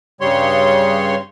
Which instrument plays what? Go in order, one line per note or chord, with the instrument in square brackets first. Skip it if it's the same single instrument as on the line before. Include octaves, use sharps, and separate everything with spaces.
[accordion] G2 C#3 G3 C#5 C6